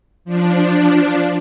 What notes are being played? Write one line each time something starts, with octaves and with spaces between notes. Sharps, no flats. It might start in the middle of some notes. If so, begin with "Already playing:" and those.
F3 D4